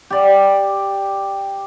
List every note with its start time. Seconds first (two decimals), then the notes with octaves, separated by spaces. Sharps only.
0.10 G4 D5